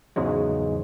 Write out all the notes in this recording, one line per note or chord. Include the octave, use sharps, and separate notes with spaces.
E2 G#2 C#3 F#3 G#3